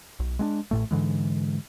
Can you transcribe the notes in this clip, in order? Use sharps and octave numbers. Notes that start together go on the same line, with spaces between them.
B1
G#3 B3 D4
A1 A2 A3
G#2 D3 E3 G#3